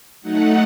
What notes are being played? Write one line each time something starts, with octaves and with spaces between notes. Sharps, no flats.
F#3 A3 D#4 F#5